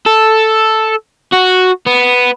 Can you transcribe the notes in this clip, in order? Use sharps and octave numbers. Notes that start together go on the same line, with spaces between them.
A4
F#4
B3